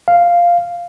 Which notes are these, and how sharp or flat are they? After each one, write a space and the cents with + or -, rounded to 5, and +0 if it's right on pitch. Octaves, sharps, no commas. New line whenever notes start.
F5 -5